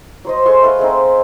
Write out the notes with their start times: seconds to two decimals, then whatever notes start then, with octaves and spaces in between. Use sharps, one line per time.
0.25 F#3 C5 D#5
0.45 G#3 A4 C6 C#6
0.63 A3 A4 B4 F5
0.79 G#3 C4 D#4